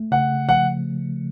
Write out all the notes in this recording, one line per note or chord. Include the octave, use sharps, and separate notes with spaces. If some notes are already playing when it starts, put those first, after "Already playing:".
Already playing: A3
C#3 F#5
F3 F#5